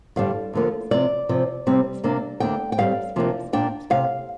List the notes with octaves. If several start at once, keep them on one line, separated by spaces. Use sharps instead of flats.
G2 D3 G3 D4 F5
D2 D3 F3 A#3
C3 F3 C4 D5
C3 F3 C4
C3 G3 C4
C3 A#3 D4
D2 D3 A#3 D4 G5
G5
G2 G3 C4 F5
C3 F3 A#3 D4
A#2 A#3 D4 G5
C3 F5